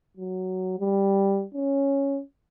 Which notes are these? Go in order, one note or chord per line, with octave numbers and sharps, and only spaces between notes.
F#3
G3
C#4